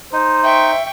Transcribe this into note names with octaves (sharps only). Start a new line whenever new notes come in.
D#4 C5
E5 G5 C#6